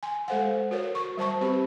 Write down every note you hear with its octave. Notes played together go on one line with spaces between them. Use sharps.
G#5 C6
G#3 A4 C5 F5 F#5
F#4 A#4 C#5
F#4 C#6
G3 C5 A5 C#6
C4 G4 B4 B5